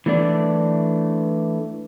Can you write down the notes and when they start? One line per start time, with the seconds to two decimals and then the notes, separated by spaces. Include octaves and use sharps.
0.06 E3 A3 D4 D5